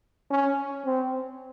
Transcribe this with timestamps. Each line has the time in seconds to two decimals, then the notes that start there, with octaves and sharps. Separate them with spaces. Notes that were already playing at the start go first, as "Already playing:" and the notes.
0.31 C#4
0.86 C4